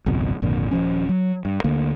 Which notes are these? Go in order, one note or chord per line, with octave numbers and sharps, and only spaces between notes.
G#1 C#2 F#2 B2
G#1 F2 A#2 D3
D#1 D#2 F3 C#4
F#3
G2
D2 D3 A#3